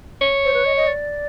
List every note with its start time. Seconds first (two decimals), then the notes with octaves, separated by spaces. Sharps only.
0.21 C#5
0.45 C5
0.54 B4
0.65 D#5
0.76 D#5
0.87 D5